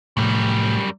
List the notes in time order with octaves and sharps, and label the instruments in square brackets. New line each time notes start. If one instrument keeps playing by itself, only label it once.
[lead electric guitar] F#2 G3 [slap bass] A2 C3 F3